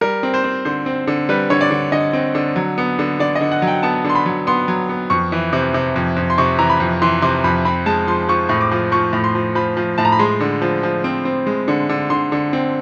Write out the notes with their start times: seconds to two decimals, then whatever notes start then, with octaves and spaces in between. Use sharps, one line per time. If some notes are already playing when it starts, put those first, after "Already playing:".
0.01 G3 A#4
0.23 C4
0.34 C5
0.44 C4
0.65 D3 C5
0.86 C4
1.07 D3
1.29 G3 B4
1.50 D3 C#5
1.61 D5
1.71 D3
1.92 D3 D#5
2.13 C4
2.35 D3
2.56 F#3
2.78 B3
2.99 D3
3.19 D3 D5
3.35 D#5
3.41 D3
3.52 F#5
3.62 F#3
3.67 G5
3.83 B3 A5
4.04 D3
4.10 C6
4.15 B5
4.26 F#3
4.47 B3 C6
4.68 F#3
4.89 B3
5.10 F2 C#6
5.32 E3
5.53 C3
5.74 C3
5.96 F2
6.16 F2
6.30 C6
6.38 C3 C#6
6.59 E3 A#5
6.69 B5
6.80 F2
7.02 E3 C6
7.22 C3 C6
7.44 F2 B5
7.65 C4 B5
7.86 G#3 A5
8.07 F3 C6
8.29 F3 C#6
8.49 A2 C#6
8.61 D6
8.71 F3
8.92 F3 C#6
9.13 A2
9.24 C6
9.35 F3
9.55 F3 B5
9.77 F3
9.98 A2 A5
10.05 A#5
10.12 B5
10.19 G#3 C6
10.40 D3
10.62 F3
10.83 F3
11.04 C4
11.25 C4
11.47 G#3
11.68 D3
11.89 D3
12.10 D3 C6
12.32 D3
12.53 C4